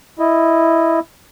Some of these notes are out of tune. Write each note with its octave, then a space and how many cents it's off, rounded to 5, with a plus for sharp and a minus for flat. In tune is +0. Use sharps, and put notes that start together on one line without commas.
E4 +0 D#5 +0